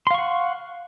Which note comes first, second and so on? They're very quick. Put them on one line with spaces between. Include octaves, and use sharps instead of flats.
C6 F5 C#6 F#5